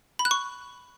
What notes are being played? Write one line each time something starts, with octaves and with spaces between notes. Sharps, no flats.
B5
F#6
C#6